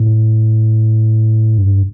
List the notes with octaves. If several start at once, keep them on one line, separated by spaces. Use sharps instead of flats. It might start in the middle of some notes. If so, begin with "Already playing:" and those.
Already playing: A2
G2